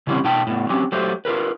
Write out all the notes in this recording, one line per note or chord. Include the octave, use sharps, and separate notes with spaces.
C#3 E3 G3 C4 C#4
B2 D#4 G5 A5
A2 B3
F#3 C4 C#4 G4
F#3 A3 G4 C5
F4 G#4 A#4 B4